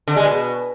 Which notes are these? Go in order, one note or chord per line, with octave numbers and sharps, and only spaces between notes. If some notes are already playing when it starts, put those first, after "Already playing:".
D3
G#3
B2